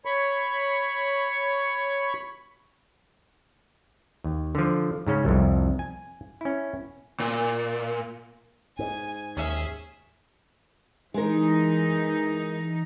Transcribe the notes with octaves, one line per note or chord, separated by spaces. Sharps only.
C#5 B5 C#6
D#2
D3 F3
G#2 C#3 C#4
C2 F2
G#5
C#4 E4
A#2
G#2 G#5
D#2 C#4 G#4 E5
E3 G#3 D#4 A#4